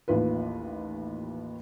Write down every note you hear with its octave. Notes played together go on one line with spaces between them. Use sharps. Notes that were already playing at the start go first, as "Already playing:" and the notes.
A1 D#2 F4 B4